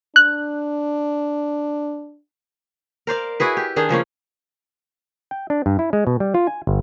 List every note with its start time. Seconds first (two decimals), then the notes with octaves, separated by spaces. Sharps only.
0.16 D4 F#6
3.07 A#4 C5 D5 F5
3.40 E4 F#4 G#4 B4
3.57 G4
3.76 D#3 D4 G#4
3.89 C#3 F3 A#3 C#4
5.31 G5
5.50 D4
5.66 G2
5.79 E4
5.93 G#3
6.07 B2
6.20 G3
6.34 F4
6.47 G#5
6.67 G1